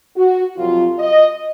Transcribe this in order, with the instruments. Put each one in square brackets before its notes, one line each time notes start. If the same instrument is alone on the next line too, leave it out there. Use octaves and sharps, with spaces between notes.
[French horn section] F#4
F2 C3 F#3 F4
D#5